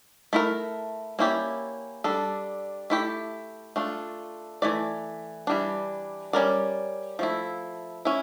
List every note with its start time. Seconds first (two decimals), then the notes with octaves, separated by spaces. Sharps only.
0.33 A3 E4 A#4
1.19 A#3 C#4 E4 G4 D5
2.04 G3 D4 A4
2.90 A3 E4 G4
3.76 A3 D4 F4
4.62 E3 A3 D5
5.47 E3 G3 D4
6.33 G3 C#4 E4 A#4 D5
7.19 F3 A3 E4
8.05 C#4 E4